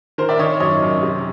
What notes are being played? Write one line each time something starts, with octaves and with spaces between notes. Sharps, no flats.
D#3 A#4 C5
D5 E5
D#3 C#5 D#5
F#2 C#5 D#5
F#2
C3